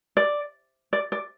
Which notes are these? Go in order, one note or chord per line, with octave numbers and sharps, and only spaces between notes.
D5
D5
D5